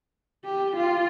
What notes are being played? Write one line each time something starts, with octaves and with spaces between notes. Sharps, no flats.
G4
F4